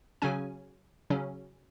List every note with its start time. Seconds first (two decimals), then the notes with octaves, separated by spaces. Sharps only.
0.22 C#3 F#3 C#4 G#5
1.10 C#3 F#3 C#4